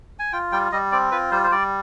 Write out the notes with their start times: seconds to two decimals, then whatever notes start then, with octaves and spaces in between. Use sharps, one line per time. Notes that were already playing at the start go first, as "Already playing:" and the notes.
0.19 G#5
0.32 F4 G5
0.52 G3 G5
0.72 G3 D#5
0.92 C4 D5
1.11 F4 B4
1.31 G3 C5
1.44 C5
1.51 G3 D5